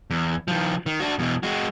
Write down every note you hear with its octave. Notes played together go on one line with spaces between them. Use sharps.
E2
D#3 F3
D#3
D4 F#4
E2 B2
G#3 F#4